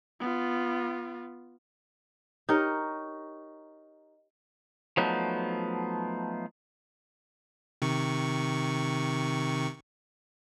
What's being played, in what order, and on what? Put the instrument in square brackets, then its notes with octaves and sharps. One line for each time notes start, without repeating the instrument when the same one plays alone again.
[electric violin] B3 F4
[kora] D#4 G4 A#4 C#5
[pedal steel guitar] F3 F#3 A3 B3 D#4
[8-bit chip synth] C3 D#3 C#6